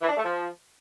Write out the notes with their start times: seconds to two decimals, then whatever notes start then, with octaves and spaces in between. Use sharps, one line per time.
0.01 E3
0.09 D4
0.16 A3
0.24 F3